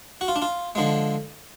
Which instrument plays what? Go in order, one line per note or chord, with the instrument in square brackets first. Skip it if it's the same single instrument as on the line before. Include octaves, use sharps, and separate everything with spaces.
[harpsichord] F#4
F4
D4
F4
D3 F3 G#3